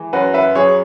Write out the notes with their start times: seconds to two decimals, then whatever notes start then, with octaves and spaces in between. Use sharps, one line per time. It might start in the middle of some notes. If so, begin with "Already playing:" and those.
Already playing: E3 G#3
0.13 F#2 F#4 B4
0.34 B4 E5
0.55 F#3 G#4 C#5